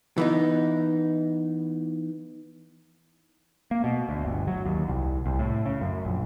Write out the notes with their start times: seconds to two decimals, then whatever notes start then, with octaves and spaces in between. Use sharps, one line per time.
0.18 E3 B3 D#4
3.71 A#3
3.84 B2
4.09 D2
4.25 G1
4.47 F#3
4.66 D#2
4.88 C2
5.26 C2
5.39 A2
5.66 C#3
5.81 F#2
6.05 A#1